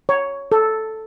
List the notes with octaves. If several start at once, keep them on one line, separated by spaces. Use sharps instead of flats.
C#5
A4